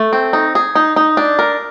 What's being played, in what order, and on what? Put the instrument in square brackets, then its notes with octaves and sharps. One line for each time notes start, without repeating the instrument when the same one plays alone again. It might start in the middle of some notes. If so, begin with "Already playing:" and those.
Already playing: [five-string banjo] A3
C4
D#4
G#4
D#4
D#4
D4
A#4